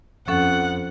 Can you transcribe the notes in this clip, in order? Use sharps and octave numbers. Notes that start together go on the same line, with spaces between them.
F2 F3 C#4 A4 F#5